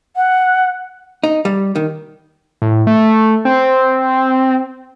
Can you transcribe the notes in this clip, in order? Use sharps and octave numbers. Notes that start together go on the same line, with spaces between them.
F#5
D#4
G3
D#3
A2
A3
C4